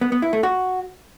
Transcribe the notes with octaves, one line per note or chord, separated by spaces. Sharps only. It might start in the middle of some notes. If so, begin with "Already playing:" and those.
B3
B3
E4
A3
F#4